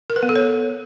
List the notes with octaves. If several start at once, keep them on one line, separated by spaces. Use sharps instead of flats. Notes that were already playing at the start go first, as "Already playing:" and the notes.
A#4
B4
B3
A4
C#5